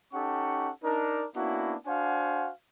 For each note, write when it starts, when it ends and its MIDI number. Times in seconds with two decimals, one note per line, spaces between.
0.13 0.69 61
0.13 0.69 63
0.13 0.69 67
0.13 0.69 69
0.13 0.69 78
0.13 0.69 85
0.83 1.25 62
0.83 1.25 63
0.83 1.25 70
1.35 1.75 58
1.35 1.75 59
1.35 1.75 61
1.35 1.75 62
1.35 1.75 64
1.35 1.75 66
1.86 2.49 62
1.86 2.49 66
1.86 2.49 72
1.86 2.49 77
1.86 2.49 78
1.86 2.49 80